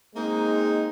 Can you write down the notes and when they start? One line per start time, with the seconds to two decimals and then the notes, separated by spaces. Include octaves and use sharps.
0.16 G#3 A#3 C4 D#4